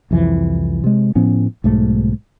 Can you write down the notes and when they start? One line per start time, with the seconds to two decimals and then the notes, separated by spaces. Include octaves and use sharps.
0.11 C2 F2 E3 F3
0.84 C3 G#3
1.15 A2 F3 B3 C#4
1.64 B1 G#2 A3